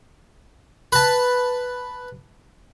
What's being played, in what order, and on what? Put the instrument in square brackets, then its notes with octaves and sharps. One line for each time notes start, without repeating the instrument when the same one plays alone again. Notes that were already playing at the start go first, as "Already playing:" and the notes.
[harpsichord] B4 A5